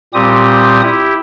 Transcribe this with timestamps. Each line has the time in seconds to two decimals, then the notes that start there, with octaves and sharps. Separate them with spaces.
0.14 A#2 G3 C4 G4 D#6
0.83 E4 G4